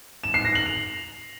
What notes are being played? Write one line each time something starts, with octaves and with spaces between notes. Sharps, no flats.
E7
C7
A#6
F#7
F7